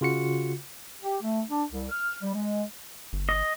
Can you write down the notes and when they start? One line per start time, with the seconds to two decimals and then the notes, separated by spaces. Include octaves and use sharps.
0.01 C#3 F4 F#4 C#7
1.03 G4
1.21 A3
1.49 D4
1.72 C2
1.90 F6
2.22 G3
2.34 G#3
3.13 G1
3.29 D#5